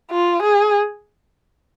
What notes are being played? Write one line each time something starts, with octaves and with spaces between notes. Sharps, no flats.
F4
G#4